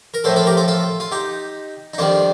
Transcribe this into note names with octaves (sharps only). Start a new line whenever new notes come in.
A#4
A2 F3 A3 A4 C5
F4 A4
G4 A#4
F4 A4
F4 A4
F4
D#4 G4
D#4
F2 D#3 G3 D4 F4